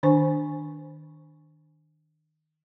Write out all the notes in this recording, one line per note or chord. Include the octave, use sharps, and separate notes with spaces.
D#3 D4 C5 G#5 C#6